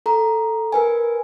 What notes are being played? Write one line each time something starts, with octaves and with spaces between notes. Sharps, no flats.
A4 A#5
A#4 B4 G#5